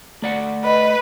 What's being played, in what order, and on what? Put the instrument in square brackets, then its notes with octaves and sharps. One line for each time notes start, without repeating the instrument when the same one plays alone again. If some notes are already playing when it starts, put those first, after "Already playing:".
[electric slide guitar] A3 D5 F#5
[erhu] B4 [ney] D#5